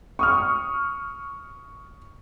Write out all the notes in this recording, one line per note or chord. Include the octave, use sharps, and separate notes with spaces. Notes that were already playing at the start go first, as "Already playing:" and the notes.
C#6 D#6 F6